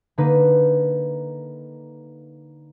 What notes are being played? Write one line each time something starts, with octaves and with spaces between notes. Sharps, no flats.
D3 A#3 D#4 B4